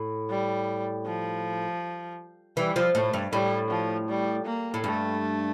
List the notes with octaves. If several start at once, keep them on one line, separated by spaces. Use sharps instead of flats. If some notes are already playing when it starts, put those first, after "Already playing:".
Already playing: A2
G3
F3
E3 G3
F3
A2 A3
G2
A2 G3
F3
G3
A#3
A2
G2 A3